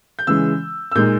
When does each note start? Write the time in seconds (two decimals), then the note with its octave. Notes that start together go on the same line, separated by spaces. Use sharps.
0.19 G6
0.27 C#3 E3 G#3 E6
0.92 E6
0.95 A#2 G#3 D#4 G6